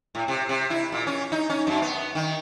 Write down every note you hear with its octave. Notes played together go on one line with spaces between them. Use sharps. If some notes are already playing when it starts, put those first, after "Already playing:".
A2
C3
C3
E4
A#2
C#4
D#4
C#4
F#2
B3
D#3